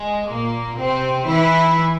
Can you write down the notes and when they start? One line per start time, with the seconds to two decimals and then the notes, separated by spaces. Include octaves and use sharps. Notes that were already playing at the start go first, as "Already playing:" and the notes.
Already playing: G#3
0.29 A#2 A#3
0.78 C3 C4
1.27 E3 E4